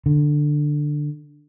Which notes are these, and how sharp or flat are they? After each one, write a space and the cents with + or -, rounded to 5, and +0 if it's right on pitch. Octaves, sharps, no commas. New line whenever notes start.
D3 +10